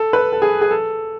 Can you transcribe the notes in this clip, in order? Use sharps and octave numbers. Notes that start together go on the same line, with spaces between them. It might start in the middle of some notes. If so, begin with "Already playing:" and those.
Already playing: A4
B4
A4
G#4
G#4
A4